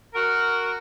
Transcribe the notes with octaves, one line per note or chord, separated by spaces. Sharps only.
F#4 A#4